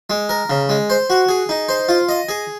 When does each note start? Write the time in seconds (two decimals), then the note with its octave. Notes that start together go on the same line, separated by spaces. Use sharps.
0.10 G#3
0.29 A#4
0.50 C#3
0.69 G#3
0.90 C5
1.10 F#4
1.29 G#4
1.49 D#4
1.69 C5
1.89 F4
2.09 D#5
2.29 G#4